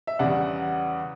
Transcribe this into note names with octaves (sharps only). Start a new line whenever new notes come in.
E5
E2 C#3 G3 D5 F#5